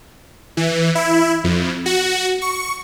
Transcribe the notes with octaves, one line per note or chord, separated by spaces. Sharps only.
E3
E4
F2
F#4
C#6